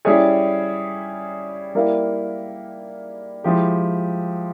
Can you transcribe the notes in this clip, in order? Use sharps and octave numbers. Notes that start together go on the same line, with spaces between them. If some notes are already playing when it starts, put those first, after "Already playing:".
G3 C#4 E4 G#4 C#5
G3 A#3 E4 A#4 F5
F3 G#3 E4 G4